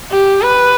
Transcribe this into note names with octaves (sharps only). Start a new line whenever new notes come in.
G4
B4